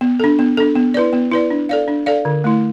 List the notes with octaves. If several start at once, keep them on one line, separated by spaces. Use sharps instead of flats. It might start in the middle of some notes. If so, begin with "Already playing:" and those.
B3
D4 A4
B3
D4 A4
B3
E4 B4 D5
B3
E4 B4 D5
D4
A4 D5 F5
D4
A4 D5 F5
D3
A3 E4